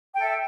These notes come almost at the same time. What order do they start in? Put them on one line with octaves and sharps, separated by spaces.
G5 A4 E5